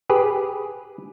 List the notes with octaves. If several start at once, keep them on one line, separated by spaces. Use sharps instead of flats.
G4 G#4 B4